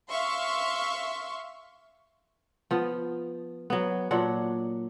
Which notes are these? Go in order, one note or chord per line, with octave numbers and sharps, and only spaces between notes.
E5 F5 C6 C#6
F3 B3
F#3 B3
A#2 F#3 D4 F#5